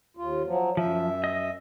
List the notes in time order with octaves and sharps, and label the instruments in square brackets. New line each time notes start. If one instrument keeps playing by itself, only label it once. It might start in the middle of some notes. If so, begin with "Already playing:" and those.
[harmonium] D#2 F4
F3 F#3
[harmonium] F#2 E5 [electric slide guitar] F3
[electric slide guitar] D#5